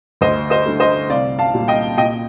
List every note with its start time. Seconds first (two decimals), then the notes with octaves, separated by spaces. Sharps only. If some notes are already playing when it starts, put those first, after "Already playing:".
0.21 D2 C5 D#5
0.50 C5 D#5
0.66 D3 A3
0.80 C5 D#5
1.10 C2 D5 F5
1.39 F5 A5
1.53 A#2 G3
1.68 D#5 G5
1.97 A#2 D#5 G5